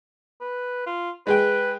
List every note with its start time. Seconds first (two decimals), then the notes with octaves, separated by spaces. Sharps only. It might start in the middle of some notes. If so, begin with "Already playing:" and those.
0.41 B4
0.86 F4
1.27 G#3 G#4 B4 G5